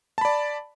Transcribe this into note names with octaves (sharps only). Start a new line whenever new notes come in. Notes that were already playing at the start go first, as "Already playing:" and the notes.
D5 A5 B5